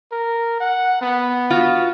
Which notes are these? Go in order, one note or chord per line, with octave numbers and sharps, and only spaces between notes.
A#4
F#5
B3
F4 F#4